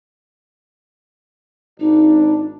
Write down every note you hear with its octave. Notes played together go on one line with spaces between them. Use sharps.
G#1 D4 D#4